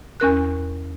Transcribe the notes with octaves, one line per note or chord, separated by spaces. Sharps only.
E2 C#4 A#4 F#6